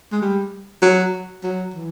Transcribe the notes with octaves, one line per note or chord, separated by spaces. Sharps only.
G#3
G3
F#3
F#3
E3